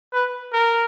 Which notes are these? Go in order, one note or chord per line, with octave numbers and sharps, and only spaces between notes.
B4
A#4